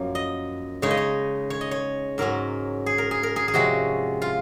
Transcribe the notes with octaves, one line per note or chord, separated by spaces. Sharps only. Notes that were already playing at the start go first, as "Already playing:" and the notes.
Already playing: F#2 F3 A#3
D#5
C#3 G#3 D#4 C#5
D#5
C#5
C#5
D#5
C#5
G#2 F#3 C#4 A#4
G#4
A#4
G#4
A#4
G#4
G#4
C3 F3 G#3 C#4 F#4
F4